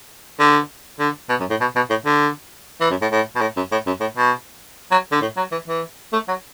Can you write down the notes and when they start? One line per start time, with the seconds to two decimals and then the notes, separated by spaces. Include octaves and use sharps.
0.40 D3
1.00 D3
1.30 B2
1.40 F#2
1.50 A2
1.61 B2
1.76 B2
1.90 A2
2.06 D3
2.81 E3
2.90 F#2
3.02 A2
3.12 A2
3.36 B2
3.41 A2
3.57 F#2
3.72 A2
3.87 F#2
4.01 A2
4.17 B2
4.92 F#3
5.12 D3
5.22 A2
5.37 F#3
5.52 E3
5.68 E3
6.13 A3
6.28 F#3